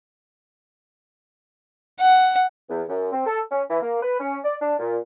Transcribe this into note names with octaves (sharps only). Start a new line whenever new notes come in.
F#5
E2
F#2
C4
A4
C#4
E3
A#3
B4
C#4
D5
D4
A#2